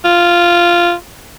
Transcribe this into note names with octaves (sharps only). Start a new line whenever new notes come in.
F4